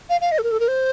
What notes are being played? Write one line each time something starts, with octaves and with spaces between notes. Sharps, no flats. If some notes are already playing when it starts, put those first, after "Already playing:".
F5
F5
D#5
A4
A#4
A4
A#4
C5